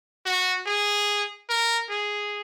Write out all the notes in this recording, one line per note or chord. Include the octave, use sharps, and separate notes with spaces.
F#4
G#4
A#4
G#4